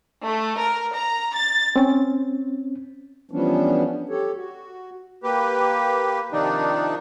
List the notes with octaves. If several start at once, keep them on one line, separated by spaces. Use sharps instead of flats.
A3
A#4
A#5
A6
C4 C#4
E3 F3 G3 B3 C#4 D4
G4 A4 C#5
F#4
A#3 G4 B4
C3 D#3 F3 D4 D#4